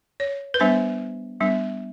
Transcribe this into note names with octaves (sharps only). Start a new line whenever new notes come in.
C#5
B4
G3 B3 D4 C5
G3 B3 D4